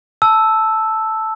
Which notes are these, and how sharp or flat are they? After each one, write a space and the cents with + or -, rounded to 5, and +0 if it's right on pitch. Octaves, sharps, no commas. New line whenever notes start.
A5 +0 E6 +0